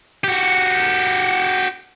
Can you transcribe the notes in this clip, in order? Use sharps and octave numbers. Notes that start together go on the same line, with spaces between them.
F#4 G4